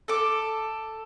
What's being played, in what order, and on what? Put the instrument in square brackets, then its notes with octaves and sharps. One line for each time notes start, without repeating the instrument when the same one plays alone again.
[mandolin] A4 D6